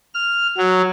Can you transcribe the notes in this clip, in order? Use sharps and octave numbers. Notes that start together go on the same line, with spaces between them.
F6
F#3